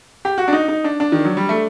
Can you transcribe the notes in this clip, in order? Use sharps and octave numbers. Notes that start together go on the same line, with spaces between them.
G4
F#4
D4
D#4
D#4
D4
D4
D#3
F#3
G3
A3